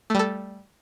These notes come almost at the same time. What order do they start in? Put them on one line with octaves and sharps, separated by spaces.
A3 G3 A4